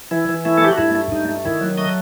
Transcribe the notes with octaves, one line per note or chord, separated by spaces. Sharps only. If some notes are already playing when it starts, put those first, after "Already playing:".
E3 E4
E3
A3 E4
A4
A3 G4
F#4
G2 E4
A3
G2 D#4
A3
D#3 E4
F#3
A3 D#5